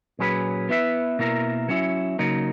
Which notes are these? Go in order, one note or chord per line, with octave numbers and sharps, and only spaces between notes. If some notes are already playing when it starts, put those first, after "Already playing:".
A#2 F#3 C#4 G#4 B4
B3 E4 B4 E5
B2 A#3 E4 A#4
F#3 C#4 E4
C#3 F#3 A#3 D#4